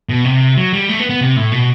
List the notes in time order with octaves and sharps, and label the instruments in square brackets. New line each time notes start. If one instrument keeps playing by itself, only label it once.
[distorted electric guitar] B2
C3
F#3
G3
A3
B3
B3
C3
A2
B2